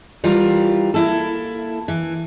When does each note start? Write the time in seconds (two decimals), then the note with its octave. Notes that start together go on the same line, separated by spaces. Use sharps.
0.24 E3 G3 F4 A#4
0.94 A#3 E4 A4
1.88 E3